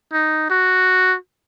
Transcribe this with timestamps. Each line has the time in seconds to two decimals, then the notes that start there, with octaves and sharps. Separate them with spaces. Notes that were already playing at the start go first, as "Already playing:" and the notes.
0.13 D#4
0.50 F#4